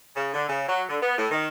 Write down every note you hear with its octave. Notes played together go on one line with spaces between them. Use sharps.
C#3
D3
C#3
F#3
D3
B3
A2
D#3